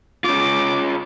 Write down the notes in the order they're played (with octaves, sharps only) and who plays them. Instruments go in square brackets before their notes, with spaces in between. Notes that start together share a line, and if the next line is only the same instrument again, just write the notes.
[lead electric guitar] C#4 F4 [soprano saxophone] D6